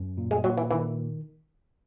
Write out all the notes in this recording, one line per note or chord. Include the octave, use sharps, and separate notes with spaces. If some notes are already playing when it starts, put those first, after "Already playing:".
Already playing: F#2
A#2
G#3
A#2 F#3
E3
D#3 E3